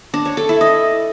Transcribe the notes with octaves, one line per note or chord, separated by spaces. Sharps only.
D4
C#5
A4
E4
D#5